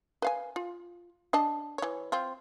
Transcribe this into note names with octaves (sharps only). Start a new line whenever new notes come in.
B4 F5 G#5
F4
D4 D#5 A5
E3 C#5
C4 F4